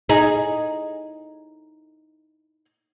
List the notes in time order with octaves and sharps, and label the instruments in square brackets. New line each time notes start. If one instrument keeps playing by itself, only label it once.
[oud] D#4 G#4